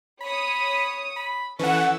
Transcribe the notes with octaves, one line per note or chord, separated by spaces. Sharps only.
C#5 B5 D#6
B5
E3 C#4 A4 F#5 E6